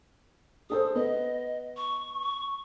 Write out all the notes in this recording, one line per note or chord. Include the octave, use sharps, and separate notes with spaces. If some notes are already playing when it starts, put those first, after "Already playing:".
G#4 A4 C5 D#6
B3 D#5
C#6